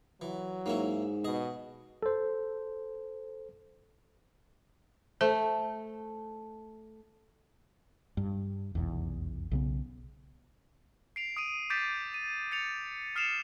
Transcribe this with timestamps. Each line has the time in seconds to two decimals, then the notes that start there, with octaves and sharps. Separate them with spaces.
0.21 E3 F#3
0.66 G#2 A#3 C#4 E4
1.24 B2 G#4 D#5
2.03 A4 C5
5.21 A3 C5
8.17 G2
8.75 F1 B1 E2
9.51 B1 C#3 B3
11.16 C7 D7 F7
11.37 D#6 D7 D#7
11.70 D6 G6 A6 B6 D7
12.14 D#7
12.52 A6 C#7 F7
13.15 D#6 F6 C7 C#7 E7 F7